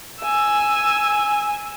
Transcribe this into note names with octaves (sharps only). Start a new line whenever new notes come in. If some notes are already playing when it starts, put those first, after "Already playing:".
G#5 E6